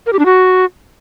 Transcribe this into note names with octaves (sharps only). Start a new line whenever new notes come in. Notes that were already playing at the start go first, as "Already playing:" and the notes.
A#4
G4
D4
F#4